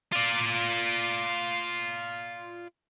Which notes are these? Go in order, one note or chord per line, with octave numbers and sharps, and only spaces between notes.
F4 D5